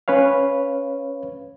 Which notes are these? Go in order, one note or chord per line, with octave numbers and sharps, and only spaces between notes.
C#4 B4 C#5 F5